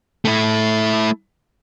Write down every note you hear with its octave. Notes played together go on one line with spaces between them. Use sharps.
A3 E4